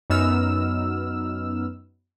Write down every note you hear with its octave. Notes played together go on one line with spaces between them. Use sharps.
F#2 B3 D#4 E6 F6